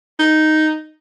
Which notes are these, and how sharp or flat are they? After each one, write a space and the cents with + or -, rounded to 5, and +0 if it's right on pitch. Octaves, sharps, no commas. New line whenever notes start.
D#4 +0